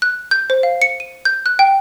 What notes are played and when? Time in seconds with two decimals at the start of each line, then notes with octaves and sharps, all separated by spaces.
0.02 F#6
0.31 G6
0.50 C5
0.63 F5
0.82 C#7
1.00 D#7
1.25 G6
1.46 F#6
1.59 G5